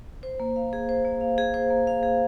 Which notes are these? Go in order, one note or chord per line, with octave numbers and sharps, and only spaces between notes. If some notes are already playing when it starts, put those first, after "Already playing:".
C5
A#3
F5
G#4
C5
A#3
F5
G#4
C5
A#3
F5
G#4